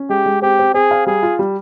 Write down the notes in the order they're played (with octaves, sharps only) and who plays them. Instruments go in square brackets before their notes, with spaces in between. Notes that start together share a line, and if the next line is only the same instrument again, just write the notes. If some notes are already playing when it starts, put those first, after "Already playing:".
Already playing: [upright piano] C#4
[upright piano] G#3 [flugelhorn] G4
[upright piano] G#3
[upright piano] C4 [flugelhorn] G4
[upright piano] C4
[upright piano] C4 [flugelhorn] G#4
[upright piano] F5
[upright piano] G3 [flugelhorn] G#4
[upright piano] F4
G3